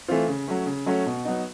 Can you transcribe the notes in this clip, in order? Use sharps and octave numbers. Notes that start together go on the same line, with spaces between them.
E3 A3 C4 F4
C#3
F#3 A3 C#4
C#3
F#3 A3 C#4
B2
F#3 B3 D#4